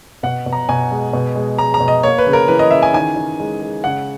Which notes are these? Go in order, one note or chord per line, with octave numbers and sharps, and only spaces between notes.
B2 F#5
B2
A#5
B2 G#5
G#3
B2
G#3
G#3 A#5
A#5
B2
D#5
A#3 C#5
B4
C#3
A#4
E3 B4
D#5
C#3 E5
G#5
D#3 G#5
D#3
G#3
G#3
C#3 F#5